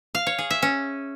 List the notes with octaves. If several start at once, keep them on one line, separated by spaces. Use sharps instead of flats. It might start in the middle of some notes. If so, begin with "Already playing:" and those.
F5
C#5
G#4
E5
C#4